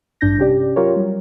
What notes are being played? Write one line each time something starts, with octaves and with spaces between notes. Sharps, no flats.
A1 G2 D4 G6 A#6
C3 C#4 G4 D5
F#3 F4 G4 A#4 C#5
F#3 G3